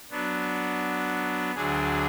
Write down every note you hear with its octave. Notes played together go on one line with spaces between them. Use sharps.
F#3 B3 D4
D2 D3 F#3 D4 G#4